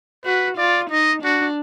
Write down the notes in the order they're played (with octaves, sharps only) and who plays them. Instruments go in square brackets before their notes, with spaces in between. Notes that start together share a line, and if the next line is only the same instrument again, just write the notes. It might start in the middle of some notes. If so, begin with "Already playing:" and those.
[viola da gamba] F#4 [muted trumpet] B4
[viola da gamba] F4 [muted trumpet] D5
[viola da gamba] D#4 [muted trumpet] D#5
[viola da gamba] D4 [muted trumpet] F#4